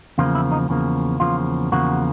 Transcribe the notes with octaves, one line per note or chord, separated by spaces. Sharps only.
E2 C#3 F3 A#3 F4
E4
D#4
E2 C#3 F3 A#3
E2 C#3 F3 A#3 F4
E2 C#3 F3 A#3 F#4